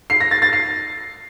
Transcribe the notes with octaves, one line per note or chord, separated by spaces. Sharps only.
C7
A#6
A6
A6
C7